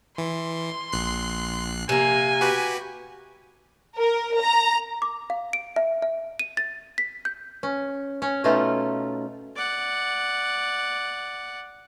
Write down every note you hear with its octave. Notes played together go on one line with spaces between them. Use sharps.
E3 C6
A#1 F#6 C7
C3 A#3 G#5
F#4 G4 B4
A#4
A#5
D6
F5
D7
E5
E5
D#7
A6
B6
G6
C#4
C#4 C#5
B2 A3 C#4 D#4 F4
D5 F#5